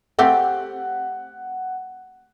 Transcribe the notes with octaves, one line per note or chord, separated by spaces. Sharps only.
A3 C4 G4 F#5